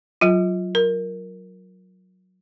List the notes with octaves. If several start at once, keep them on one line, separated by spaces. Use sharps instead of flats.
F#3 F4
A#4